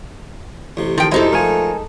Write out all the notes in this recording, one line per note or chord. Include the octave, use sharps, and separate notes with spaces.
A1 C3
D#3 F3 G5
C2 F#2 C3 G#3 D#4 E4 A4 C5
F3 A3 A#4 G#5